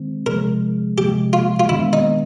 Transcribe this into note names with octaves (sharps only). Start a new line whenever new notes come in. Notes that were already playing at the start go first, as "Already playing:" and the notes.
Already playing: D#3 G#3 C4
C3 F3 G#3 A#4
C3 F3 G#3 G4
F4
F4
D#3 G#3 B3 D4 E4
D#4